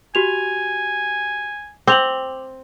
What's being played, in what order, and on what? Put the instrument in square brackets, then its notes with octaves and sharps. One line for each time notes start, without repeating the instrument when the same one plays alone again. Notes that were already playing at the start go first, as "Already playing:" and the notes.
[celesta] F#4 G4 F7 [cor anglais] G#5
[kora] C4 [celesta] D6 F7 F#7